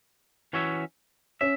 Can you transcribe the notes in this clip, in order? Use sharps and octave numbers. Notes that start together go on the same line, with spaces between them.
E3 C#4 F#4 C#5 E5
C#4 E5